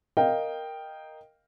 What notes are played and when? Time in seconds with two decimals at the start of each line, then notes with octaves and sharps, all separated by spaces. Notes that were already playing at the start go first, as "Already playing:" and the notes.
0.17 A#4 D#5 F5 G5